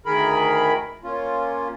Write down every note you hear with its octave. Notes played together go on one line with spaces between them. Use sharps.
D2 D#3 G#4 A#4 B5
A#3 C#4 F4